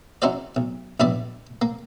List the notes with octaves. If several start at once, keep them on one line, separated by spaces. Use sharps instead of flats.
C#4 D#4 E4 F#4 C5 D5
B1
A#1 G2 B2 E4 D5 B5
A#3